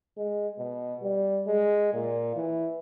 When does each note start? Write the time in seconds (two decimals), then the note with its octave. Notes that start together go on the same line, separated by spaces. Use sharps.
0.17 G#3
0.59 B2
1.03 G3
1.47 G#3
1.94 A#2
2.36 E3